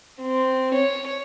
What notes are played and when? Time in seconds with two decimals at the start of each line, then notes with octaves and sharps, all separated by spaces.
0.21 C4
0.75 C#5